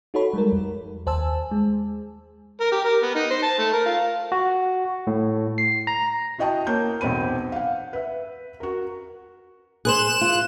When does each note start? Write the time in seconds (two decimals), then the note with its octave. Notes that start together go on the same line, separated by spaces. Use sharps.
0.14 D#4 F#4 A4 C#5 B5
0.33 G3 G#3 A#4
0.52 F2
1.07 D#2 C5 G#5 A5 E6
1.51 G#3
2.61 A#4
2.72 G4
2.85 A#4
3.03 B3
3.15 D#4
3.31 C5
3.43 A5
3.59 A3
3.73 A#4
3.86 F4
4.32 F#4
5.07 A2
5.58 C7
5.87 A#5
6.38 E4 F#4 D#5 G5 A5 D#6
6.67 A#3 C#5 G6
7.01 B1 E2 C4 B5 D#7
7.52 F5 F#5
7.93 B4 E5
8.60 F#4 A#4
9.85 G#4 B4 C5 F#6 E7
10.21 F4